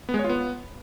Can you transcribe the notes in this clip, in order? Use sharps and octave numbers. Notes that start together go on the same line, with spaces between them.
B3
G#3
C#5
F4
B3